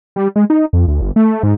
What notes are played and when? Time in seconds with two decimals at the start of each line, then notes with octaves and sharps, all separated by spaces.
0.16 G3
0.36 G#3
0.50 D#4
0.73 F2
0.88 D2
1.01 G1
1.16 A3
1.43 G#2